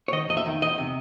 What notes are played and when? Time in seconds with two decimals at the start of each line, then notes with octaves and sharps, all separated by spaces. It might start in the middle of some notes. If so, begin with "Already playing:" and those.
0.08 C#5
0.13 D#3 D#5
0.29 E2 D#5
0.37 E5
0.46 D#3
0.62 E2 D#5
0.78 C3